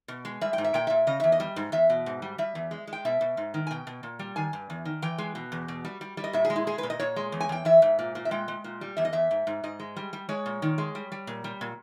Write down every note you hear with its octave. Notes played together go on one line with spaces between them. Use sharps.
B2
G#3
G3 E5
G5
G#2
E5
A#2 G5
A#2 E5
C#3 D#5
E2 E5
D#5
G3
G#2
E2 E5
B2
G#2
G3
G3 E5
E2
G#3
G#3
G5
B2 E5
B2
G#2
D#3
G#5
B2 G5
B2
A#2
G3
D#3 G#5
G2
E2
D#3
E3 G5
G#3
B2
E2
B2
G3
G3
G3
D#5
A#2 E5
G#4
G#3
E4
G#3 G#4
B4
A#2
D#5
A#2 C#5
G#3
E2
G#5
E2 G5
E3 E5
G#2
A#2
A#2
E5
G#3 G5
G#3
A#2
G3
E2 E5
D#5
E2 E5
G#2
G#2
G#2 D#5
G#3
G3
G3
G#3 C#5
A#2
D#3
G#3
G3
G3
A#2
G3
A#2